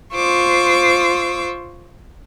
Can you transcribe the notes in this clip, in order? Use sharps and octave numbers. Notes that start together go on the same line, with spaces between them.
F4 C5 C#6 D6 E6